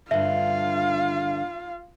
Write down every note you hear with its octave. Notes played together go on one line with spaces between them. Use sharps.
G2 D3 F4 E5 F5